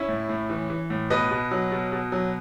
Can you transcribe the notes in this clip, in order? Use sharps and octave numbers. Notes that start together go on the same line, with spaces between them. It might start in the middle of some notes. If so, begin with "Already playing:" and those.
Already playing: C#4 E4
A2
A2
E3
E3
A2
B2 B4 D#5
B2
F#3
B2
B2
F#3